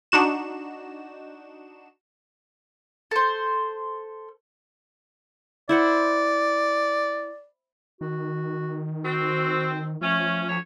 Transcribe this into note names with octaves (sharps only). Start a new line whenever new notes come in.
D4 D#4 F#4 E7
A4 C5
E4 C5 D5 F#5
D#3 F#4
C4 F#4
F3 A3 C#4
D2 C#5